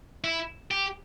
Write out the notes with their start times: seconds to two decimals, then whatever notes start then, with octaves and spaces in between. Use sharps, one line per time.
0.24 E4
0.71 G4